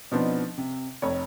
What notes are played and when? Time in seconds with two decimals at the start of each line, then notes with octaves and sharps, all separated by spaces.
0.11 B2 F3 B3 C4 D4 D#4
0.58 C3
1.02 F1 F2 C#5